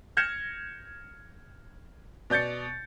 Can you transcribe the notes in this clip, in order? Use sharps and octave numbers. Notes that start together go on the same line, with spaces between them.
F6 G6 G#6 A#6 C#7 E7
B2 D5 G6 A6 C#7